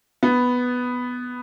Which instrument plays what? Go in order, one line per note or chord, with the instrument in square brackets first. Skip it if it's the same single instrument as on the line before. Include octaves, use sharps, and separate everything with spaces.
[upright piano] B3